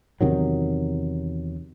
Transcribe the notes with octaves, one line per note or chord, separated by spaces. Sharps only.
E2 C3 D#3 F#3